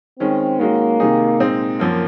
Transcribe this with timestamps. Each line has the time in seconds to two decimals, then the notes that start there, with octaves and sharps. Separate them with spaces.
0.19 D#3 G#3 C4 C#4
0.59 D#3 G#3 A#3 C#4 F#4
1.00 C3 D#3 G#3 D#4 G#4
1.40 A#2 G#3 C4 D#4
1.79 F#2 F3 A#3